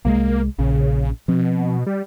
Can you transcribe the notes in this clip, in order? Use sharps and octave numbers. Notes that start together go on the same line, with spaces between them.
C2 F#3 G#3 A#3
A#1 C#3
B2 F3 C4
G3